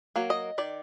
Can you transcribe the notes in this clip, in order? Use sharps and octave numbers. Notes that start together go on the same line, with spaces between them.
F#3 A#3
D#5
D#3 D5